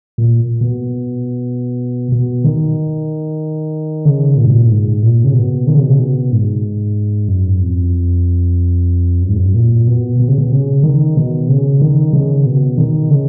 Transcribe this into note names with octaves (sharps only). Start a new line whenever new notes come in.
A#2
B2
B2
D#3
C#3
A#2
G#2
A#2
G#2
A#2
C#3
B2
D#3
C#3
B2
C#3
B2
G#2
F#2
F2
F#2
G#2
F#2
A#2
B2
B2
C#3
B2
C#3
D#3
B2
C#3
D#3
C#3
B2
D#3
C#3